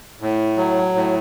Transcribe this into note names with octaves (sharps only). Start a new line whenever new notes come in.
A2
F#3
A2